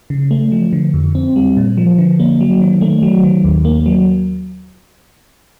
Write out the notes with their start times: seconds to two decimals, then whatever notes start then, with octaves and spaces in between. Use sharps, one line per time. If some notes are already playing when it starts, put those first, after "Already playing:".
0.10 C#3
0.31 A3
0.52 F3
0.73 D3
0.94 F2
1.15 C4
1.36 G3
1.57 A#2
1.77 F3
1.98 D3
2.20 A#3
2.41 F#3
2.61 D#3
2.81 A3
3.03 F#3
3.23 D#3
3.44 D#2
3.65 A#3
3.86 F#3